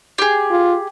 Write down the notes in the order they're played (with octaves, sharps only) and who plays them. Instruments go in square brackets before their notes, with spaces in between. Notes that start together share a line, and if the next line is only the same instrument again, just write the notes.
[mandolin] G4 G#4
[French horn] F4